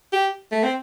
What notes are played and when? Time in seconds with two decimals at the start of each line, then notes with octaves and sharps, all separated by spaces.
0.13 G4
0.52 A3
0.64 C4